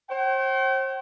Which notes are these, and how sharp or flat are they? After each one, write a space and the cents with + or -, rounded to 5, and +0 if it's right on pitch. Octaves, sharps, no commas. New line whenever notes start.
C5 +40 G5 -40